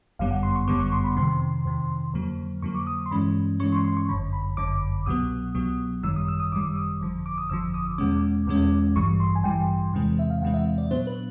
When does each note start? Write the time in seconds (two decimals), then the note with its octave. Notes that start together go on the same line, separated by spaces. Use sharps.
0.19 G1 F#2 D3 G3 B3 F5
0.31 F#5
0.43 C6
0.56 C#6
0.68 G1 F#2 D3 G3 B3 D6
0.80 C#6
0.92 C6
1.04 B5
1.16 F2 C3 D#3 C6
1.65 F2 C3 D#3
2.14 F2 D3 F#3 A#3
2.62 F2 D3 F#3 A#3 C#6
2.75 D6
2.87 D#6
3.06 C6
3.11 G2 E3 G#3 C#4 B5
3.60 G2 E3 G#3 C#4 C#6
3.72 C6
3.84 C6
3.97 C#6
4.09 G1 F#2 D3 B5
4.33 B5
4.57 G1 F#2 D3 D6
5.06 C2 B2 F#3 B3 D#6
5.55 C2 B2 F#3 B3
6.03 G#1 F#2 D#3 G3 E6
6.16 D#6
6.28 E6
6.40 D#6
6.52 G#1 F#2 D#3 G3 D6
6.76 D#6
7.00 G1 F2 D3 F3
7.26 D6
7.38 D#6
7.50 G1 F2 D3 F3 E6
7.74 D#6
7.98 E2 B2 G#3 C#4 D6
8.47 E2 B2 G#3 C#4
8.95 A1 G2 E3 G3 C#6
9.20 C6
9.35 G#5
9.44 A1 G2 E3 G3 G5
9.93 E2 C3 E3 G#3 C4
10.19 E5
10.30 F5
10.42 E2 C3 E3 G#3 C4 F#5
10.54 E5
10.78 D5
10.91 A#2 F#3 B3 D4 C5
11.07 B4